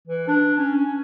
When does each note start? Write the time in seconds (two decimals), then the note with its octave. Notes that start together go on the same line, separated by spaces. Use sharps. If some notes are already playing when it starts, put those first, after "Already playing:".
0.07 E3
0.28 D4
0.58 C#4
0.75 C#4